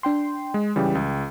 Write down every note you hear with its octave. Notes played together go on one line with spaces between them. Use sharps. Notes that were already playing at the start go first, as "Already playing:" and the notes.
D4 G5 C6
G#3
C#3 E3 G3 G5
C#2